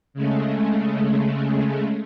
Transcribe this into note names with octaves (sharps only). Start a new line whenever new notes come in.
C#3 G#3 A3